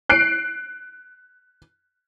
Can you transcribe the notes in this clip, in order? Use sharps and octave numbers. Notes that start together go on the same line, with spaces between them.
F#6 C7 D7